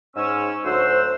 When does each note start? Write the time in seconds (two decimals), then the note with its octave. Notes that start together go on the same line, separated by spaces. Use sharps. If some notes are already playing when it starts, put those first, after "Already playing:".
0.16 G#2 C#4 E6
0.65 D2 F#3 F#4 C5 C6 E6